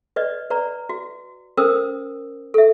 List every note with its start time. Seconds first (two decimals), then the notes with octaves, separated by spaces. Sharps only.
0.16 B4 D5 D#5
0.50 B4 D5 A#5
0.89 F#4
1.57 C#4 A#4 C5 G5 D#6 E6
2.54 A4 E5